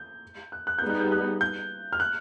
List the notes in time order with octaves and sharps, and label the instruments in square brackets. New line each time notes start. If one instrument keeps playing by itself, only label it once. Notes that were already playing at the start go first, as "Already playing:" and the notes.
Already playing: [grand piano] G6
F#6
F#6
[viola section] G3 B3 D#4 G#4 [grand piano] G6
[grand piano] F#6
G6
F#6
G6
F6
F#6